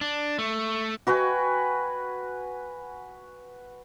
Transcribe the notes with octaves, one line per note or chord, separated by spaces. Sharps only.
D4
A3
F#4 B4 G5 G#5